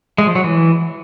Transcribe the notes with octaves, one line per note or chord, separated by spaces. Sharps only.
G#3
F3
F#3
E3